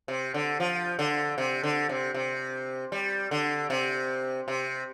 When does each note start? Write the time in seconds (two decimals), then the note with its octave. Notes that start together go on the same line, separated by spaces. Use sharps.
0.08 C3
0.34 D3
0.60 F3
0.99 D3
1.38 C3
1.63 D3
1.89 C3
2.14 C3
2.92 G3
3.31 D3
3.70 C3
4.48 C3